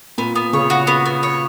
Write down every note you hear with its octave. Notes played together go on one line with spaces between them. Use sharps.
A#2 B3
B3
C#3 C#5
F#4
B3
B3
C#5